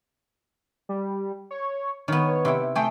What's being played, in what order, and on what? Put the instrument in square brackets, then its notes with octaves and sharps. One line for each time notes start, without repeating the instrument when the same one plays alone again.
[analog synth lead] G3
C#5
[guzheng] D#3 B3 [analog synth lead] C#5
[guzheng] C3 E4 G5
[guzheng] A3 G#4 [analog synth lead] G5